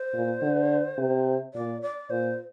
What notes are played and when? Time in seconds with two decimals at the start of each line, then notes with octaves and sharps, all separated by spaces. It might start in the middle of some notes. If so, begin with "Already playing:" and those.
Already playing: C5
0.13 A#2
0.42 D3
0.98 C3
1.54 A#2 D5
1.82 D5
2.10 A#2 C5